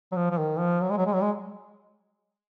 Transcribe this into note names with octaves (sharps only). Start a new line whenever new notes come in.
F#3
F3
F3
D#3
F3
F#3
G#3
F#3
G#3
F#3
G#3